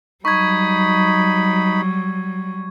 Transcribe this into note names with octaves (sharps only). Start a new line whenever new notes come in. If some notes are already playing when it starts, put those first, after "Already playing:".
F#3 G3 D#4 B5 C#6 G#6